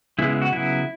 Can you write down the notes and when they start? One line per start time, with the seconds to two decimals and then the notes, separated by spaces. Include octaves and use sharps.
0.19 C#3 G#3 B3 E4
0.30 E4
0.42 F#4
0.52 C#3 F#3 B3 E4